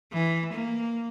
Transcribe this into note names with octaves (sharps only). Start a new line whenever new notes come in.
E3
A#3